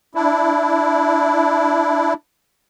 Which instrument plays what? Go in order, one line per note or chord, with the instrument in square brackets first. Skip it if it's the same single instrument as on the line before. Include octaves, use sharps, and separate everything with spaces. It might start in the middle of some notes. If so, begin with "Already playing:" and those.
[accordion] D4 E4